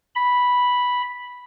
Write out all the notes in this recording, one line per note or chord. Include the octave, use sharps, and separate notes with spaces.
B5